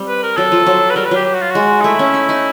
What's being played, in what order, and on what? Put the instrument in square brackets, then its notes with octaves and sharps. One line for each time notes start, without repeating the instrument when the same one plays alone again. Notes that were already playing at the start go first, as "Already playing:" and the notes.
Already playing: [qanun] G3 C4
[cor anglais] B4
A#4
[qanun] F#3 [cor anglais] A4
[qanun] F3
F#3
[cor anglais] B4
[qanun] G3 [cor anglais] A#4
[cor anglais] B4
[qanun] F#3 [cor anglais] G4
[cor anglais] G4
F#4
F4
[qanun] G#3 [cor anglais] F#4
[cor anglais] D#4
[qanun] A3 [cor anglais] E4
[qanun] C#4
D#4
D#4